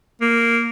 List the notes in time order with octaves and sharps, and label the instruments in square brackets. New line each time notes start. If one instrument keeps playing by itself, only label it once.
[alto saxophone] A#3